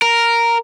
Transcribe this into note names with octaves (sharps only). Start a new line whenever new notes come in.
A#4